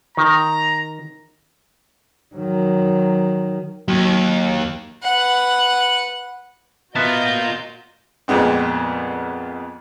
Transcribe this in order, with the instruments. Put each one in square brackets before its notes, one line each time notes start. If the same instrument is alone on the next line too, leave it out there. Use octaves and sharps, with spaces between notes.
[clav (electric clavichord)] D#3 [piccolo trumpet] A#5
[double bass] D#3 F#3
[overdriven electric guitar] D#2 [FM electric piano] F#3
[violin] B4 F#5
[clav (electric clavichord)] B3 E5 A5 [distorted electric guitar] F4 A#4 [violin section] F#4 D#5 G6
[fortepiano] F2 A#2 G#3 B3 C4